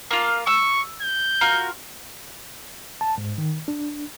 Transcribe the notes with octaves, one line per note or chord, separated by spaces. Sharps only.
A#3 F4
C#6 E6
G6
F4 F#4 A#4
A5
G#2
D#3
D4